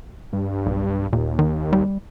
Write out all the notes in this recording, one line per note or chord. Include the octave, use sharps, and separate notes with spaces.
G2
B1
D#2 A#2
D#3
G3